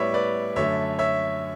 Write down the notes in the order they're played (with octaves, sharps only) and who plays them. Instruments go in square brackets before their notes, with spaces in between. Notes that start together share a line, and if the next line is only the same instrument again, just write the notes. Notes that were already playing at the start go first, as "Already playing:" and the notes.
Already playing: [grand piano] A2 G3 B3 B4 C#5 D5 E5
B4 D5
F#2 D3 A3 C#5 E5
C#5 E5